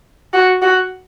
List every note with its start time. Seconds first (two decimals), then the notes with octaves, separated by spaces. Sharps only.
0.33 F#4
0.62 F#4